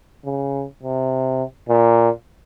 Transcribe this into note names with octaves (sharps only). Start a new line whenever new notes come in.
C#3
C3
A#2